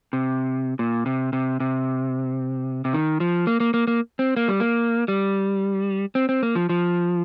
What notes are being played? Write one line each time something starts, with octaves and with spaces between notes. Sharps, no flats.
C3
A#2
C3
C3
C3
C3
D#3
F3
A#3
A#3
A#3
A#3
C4
A#3
G3
A#3
G3
C4
C4
A#3
F3
F3